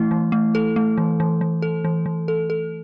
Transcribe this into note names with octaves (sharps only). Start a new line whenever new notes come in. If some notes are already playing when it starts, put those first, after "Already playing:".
Already playing: E3 A3 E4
E3
A3
A4
A3
E3
E3
E3
A4
E3
E3
A4
A4